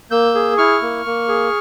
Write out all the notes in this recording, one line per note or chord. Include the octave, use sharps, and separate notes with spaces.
A#3 E6 G6
G#4
E4 C#6 F6
A#3
A#3
G#4